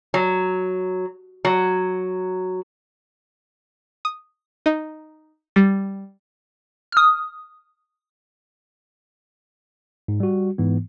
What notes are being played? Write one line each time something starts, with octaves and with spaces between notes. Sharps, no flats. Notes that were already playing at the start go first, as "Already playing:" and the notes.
F#3
F#3
D#6
D#4
G3
D#6 F6
G#2
G3 F#4
G#2 E3 B3